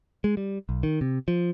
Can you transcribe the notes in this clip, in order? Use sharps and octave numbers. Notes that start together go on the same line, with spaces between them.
G#3
G3
B1
D#3
C3
F3